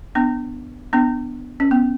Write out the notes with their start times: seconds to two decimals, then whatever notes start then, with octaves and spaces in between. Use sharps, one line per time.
0.15 B3 D4
0.93 B3 D4
1.60 C#4
1.71 B3